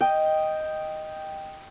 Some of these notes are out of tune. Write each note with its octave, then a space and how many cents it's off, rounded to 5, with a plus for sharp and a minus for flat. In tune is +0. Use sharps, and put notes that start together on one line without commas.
D#5 +0 G5 +0